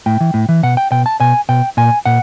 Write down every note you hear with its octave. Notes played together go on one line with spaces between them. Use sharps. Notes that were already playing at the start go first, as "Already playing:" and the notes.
A2 G5
E3
A2
E3
B2 F#5
G5
B2 G5
A5
B2 G#5
B2 G5
A#2 G#5
A#2 F#5